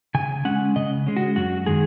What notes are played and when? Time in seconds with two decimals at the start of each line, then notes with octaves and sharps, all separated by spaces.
0.15 C#3 G#5
0.45 G#3 C#4 F#5
0.76 C#3 D#5
1.07 G#3 C#4
1.16 F#4
1.36 F#2 F#4
1.66 D#3 G#3 G#4